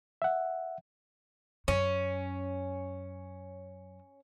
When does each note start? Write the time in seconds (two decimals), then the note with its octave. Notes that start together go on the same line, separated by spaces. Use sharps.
0.22 E5 F#5
1.68 F#2 C#4